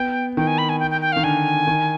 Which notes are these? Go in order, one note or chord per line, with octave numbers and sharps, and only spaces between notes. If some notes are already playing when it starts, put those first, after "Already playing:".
Already playing: B3 G5
D#3 G5
G#5
B5
G#5
G5
G5
G5
D#3 F5
D3 G#5
D#3